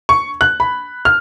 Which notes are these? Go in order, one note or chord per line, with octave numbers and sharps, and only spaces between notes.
C#6
F#6
B5
F6